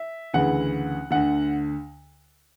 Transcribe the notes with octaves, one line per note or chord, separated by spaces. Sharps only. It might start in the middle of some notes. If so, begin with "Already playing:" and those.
Already playing: E5
D2 C#3 E3 F#5
D2 D3 F#5